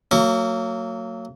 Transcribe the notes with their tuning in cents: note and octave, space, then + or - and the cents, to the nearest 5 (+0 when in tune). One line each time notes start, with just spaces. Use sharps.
F#3 +0 A#3 -35 C#6 +35